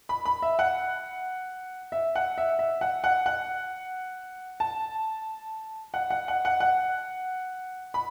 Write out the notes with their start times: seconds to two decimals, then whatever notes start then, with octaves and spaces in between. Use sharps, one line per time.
0.09 B5
0.25 B5
0.42 E5
0.59 F#5
1.92 E5
2.16 F#5
2.38 E5
2.59 E5
2.81 F#5
3.04 F#5
3.26 F#5
4.60 A5
5.94 F#5
6.10 F#5
6.28 F#5
6.45 F#5
6.60 F#5
7.94 B5